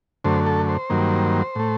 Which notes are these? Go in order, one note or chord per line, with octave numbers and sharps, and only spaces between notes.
F#2 D3 A3 C5
A4
C5
G2 D#3 F#3 A#3
A2 A3